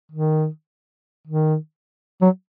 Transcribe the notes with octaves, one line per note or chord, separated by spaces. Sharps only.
D#3
D#3
F#3